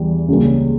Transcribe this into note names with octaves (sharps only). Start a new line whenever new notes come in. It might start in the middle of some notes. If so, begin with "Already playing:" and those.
Already playing: E2 E3 G3
C#2 C#3 G3 A#3 C#4